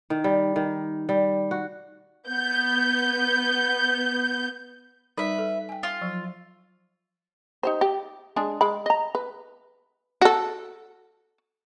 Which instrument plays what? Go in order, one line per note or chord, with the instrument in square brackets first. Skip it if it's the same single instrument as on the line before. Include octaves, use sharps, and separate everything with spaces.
[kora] D#3
G3
D#3
G3
F#4
[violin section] B3 G6
[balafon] G3 D#4 A#4 [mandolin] B4 E5
[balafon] A4
G5 G#5
[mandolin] F4
[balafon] F3 F#3
[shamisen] D#4 G4 C5
G4
G#3 D4 G#4
G#3 B5
D#5 A#5
B4
F#4 A4